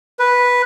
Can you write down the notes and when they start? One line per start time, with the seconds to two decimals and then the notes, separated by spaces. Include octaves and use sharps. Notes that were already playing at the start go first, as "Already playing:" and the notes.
0.19 B4